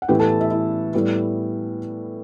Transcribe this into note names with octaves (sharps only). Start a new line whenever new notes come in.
F#5
A2 E3 B3 E4 G4 G5
A4 A5
E4 E5
E4 E5
A2 G3 B3 E4